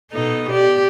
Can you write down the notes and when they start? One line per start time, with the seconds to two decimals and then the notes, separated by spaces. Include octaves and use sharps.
0.12 B2 D#4 A4
0.50 G4 D5